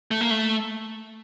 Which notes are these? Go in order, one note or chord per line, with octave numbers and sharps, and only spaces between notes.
A3
A#3
A3